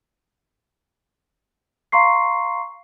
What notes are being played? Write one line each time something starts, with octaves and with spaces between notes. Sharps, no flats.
F5 A#5 C6 C#6 C7